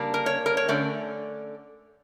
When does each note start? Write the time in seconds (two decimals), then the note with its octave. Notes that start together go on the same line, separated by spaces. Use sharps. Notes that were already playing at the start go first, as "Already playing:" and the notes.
Already playing: C#3 G3 A#3 D4
0.14 A#4
0.26 C#5
0.46 A#4
0.57 C#5
0.68 D3 A3 C#4 D5